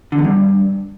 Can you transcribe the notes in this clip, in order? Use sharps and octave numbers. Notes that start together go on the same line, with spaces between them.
D3
E2
G2